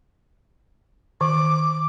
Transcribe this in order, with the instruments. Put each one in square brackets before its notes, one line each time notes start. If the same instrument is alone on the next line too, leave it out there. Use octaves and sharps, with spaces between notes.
[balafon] D#3 [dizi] D6